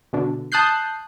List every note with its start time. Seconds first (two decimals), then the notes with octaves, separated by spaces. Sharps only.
0.13 B2 D3
0.52 A5 D#6 F#6 G6 C7